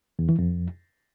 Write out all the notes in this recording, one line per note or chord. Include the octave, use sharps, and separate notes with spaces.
E2
E3
F2